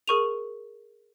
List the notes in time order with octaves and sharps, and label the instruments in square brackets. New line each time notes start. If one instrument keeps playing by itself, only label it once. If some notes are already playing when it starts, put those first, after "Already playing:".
[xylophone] G#4 A#4 C#6 D#7 F7